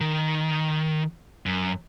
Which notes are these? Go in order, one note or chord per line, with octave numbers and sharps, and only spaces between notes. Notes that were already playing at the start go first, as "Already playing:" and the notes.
D#3
F#2